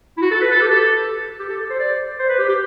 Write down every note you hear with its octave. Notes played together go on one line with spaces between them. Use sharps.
E4
F#4
A4
B4
A4
G4
A4
G4
A4
A4
C5
D5
C5
B4
G4
G4